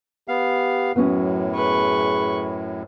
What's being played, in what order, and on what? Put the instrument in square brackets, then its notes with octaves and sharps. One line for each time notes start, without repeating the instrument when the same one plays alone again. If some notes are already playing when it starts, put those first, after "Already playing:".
[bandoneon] B3 F5 [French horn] G4
[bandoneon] F#2 A2 [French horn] F#3 [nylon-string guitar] B3 C#4
[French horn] G#4 [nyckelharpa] B4 C#6